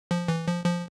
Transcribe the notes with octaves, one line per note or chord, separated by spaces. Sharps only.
F3
E3
F3
F3